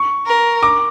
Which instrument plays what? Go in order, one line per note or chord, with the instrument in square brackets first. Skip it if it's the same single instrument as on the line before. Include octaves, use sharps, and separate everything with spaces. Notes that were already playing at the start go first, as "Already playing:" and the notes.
Already playing: [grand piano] C#6
[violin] A#4
[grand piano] D6